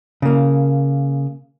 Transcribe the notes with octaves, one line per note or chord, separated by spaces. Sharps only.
C#3 A#3